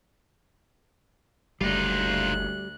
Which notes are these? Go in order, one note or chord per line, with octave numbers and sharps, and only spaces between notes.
F#1 D2 G3 D#4 F4 F#6